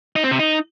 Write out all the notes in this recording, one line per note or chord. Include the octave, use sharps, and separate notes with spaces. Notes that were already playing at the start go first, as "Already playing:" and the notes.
D#4
C4
C3
D#4